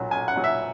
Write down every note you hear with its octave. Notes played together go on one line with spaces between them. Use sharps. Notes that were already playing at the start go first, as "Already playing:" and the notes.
Already playing: B1 A#2 F#3
B1 G#5
F#5
A#2 F#3
E5